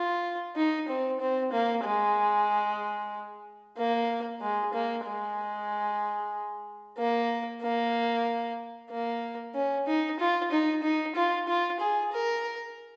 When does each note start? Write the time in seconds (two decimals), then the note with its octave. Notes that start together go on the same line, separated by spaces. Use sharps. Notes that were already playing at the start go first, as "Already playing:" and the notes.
Already playing: F4
0.55 D#4
0.88 C4
1.20 C4
1.52 A#3
1.84 G#3
3.77 A#3
4.41 G#3
4.73 A#3
5.05 G#3
6.98 A#3
7.62 A#3
8.91 A#3
9.55 C#4
9.87 D#4
10.20 F4
10.51 D#4
10.83 D#4
11.15 F4
11.48 F4
11.80 G#4
12.12 A#4